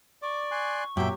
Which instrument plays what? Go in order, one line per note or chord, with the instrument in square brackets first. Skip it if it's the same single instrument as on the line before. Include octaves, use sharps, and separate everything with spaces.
[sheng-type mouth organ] D5 [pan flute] C#6 [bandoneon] D6
[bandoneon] G#5 C6 F#6
[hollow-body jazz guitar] F#2 A#2 [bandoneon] F#3 G4 [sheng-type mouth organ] E5 G5